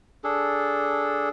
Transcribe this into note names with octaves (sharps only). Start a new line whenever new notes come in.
D4 G#4 A4